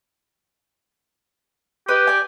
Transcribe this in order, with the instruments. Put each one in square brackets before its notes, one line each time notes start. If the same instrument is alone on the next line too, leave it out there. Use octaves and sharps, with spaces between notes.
[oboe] G4 [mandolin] B4 D#5
[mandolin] D5 G#5